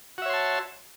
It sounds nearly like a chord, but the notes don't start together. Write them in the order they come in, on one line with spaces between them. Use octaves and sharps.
F#4 E5 C#5 C6 A5